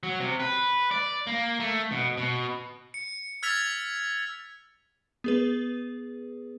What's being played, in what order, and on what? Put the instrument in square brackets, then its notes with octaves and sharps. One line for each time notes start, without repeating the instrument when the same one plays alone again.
[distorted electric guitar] F#3
C3
B4
D5
A#3
A3
B2
B2
[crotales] C#7
E6 F6 G#6 A6 B6 F7
[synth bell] B3 G#4 B4